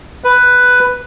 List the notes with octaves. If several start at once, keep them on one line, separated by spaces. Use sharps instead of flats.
B4